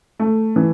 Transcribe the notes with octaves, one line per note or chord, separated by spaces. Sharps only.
A3
E3